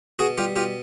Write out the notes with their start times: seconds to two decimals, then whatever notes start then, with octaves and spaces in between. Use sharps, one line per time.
0.19 B2 F#4 G#4
0.38 G3 F4 G4
0.56 B2 F4 G4